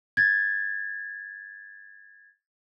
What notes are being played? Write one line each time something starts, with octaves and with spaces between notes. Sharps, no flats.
G#6 A6